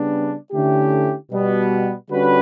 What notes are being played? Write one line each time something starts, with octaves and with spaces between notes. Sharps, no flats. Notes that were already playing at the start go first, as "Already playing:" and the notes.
Already playing: C#3 G3 B3 D4
D3 A3 C#4 E4 G4
B2 G3 B3
D3 G3 C#4 F#4 B4